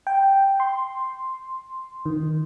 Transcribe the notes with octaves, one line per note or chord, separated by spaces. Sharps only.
G5
C6
D#3